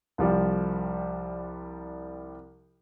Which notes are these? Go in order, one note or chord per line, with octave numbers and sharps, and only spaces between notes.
C2 F3 G3